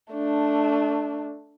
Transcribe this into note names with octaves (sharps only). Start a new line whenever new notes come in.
A3 D4